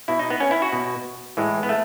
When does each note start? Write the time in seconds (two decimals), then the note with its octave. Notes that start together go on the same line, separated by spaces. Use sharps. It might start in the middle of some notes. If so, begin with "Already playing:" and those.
0.08 B2 E4
0.19 D#4
0.30 B3
0.40 C#4
0.51 E4
0.62 F#4
0.73 B2
1.37 A2 E3 G#3
1.63 B3
1.69 A3